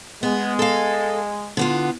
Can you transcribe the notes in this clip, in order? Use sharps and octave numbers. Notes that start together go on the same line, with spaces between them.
G#3 B3
A4 F5
D3 B3 F4